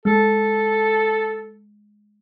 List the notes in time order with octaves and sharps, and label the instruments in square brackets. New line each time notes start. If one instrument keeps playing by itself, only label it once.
[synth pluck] G#3 [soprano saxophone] A4